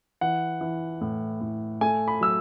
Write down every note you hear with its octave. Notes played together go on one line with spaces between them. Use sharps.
E3 F#5
E3
A2
A2
A3 G#5
B5
F#3 E6